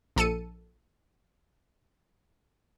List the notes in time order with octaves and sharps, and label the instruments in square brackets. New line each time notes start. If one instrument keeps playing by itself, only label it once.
[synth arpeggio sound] A#1 A4 C#7 D#7